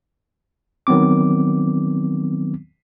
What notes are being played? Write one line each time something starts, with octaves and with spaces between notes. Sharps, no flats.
D#3 F#3 B3 C4 D6